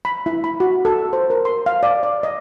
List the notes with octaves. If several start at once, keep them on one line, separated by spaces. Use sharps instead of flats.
B5
E4
B5
F#4
A4
C5
A#4
C6
F5
D5
D5
D#5